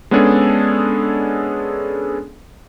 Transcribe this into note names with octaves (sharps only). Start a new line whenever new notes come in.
G#3 B3 C#4 D4 G#4 A4